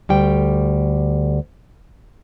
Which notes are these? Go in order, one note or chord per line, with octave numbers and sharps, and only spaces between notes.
D2 G3 G5